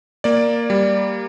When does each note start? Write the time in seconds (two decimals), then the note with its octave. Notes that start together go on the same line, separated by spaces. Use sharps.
0.24 A#3 D5
0.70 G3